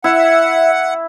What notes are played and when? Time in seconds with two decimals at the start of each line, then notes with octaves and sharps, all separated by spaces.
0.04 E4 E5 F#5